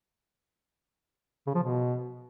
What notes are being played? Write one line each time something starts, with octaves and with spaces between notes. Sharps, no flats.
C#3
F3
B2